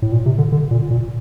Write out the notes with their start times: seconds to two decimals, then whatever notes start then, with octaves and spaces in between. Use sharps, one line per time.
0.02 A2
0.12 A#2
0.26 C3
0.38 D3
0.52 D3
0.71 A#2
0.91 A#2